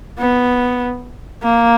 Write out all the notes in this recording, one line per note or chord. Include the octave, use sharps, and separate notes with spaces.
B3
A#3